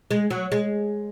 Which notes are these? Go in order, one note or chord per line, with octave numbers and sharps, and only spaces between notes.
G#3
F#3
G#3